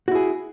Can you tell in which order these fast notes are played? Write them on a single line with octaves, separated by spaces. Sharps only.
F#4 E4 G#4